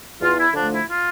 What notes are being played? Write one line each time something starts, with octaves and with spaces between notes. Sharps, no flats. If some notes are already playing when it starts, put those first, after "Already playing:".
E2 F4
E4
D3 F3 A3 D4
E4
F4